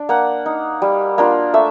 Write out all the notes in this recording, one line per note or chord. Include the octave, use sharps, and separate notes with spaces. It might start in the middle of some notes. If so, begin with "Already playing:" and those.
Already playing: D4
A#3 F#5
D#4
G3
A#3 D4 F4
A3 E5